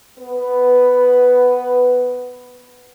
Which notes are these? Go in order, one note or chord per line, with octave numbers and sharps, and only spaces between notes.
B3 B4